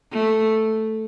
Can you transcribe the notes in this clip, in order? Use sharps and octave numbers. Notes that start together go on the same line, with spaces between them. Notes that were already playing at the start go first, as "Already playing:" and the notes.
A3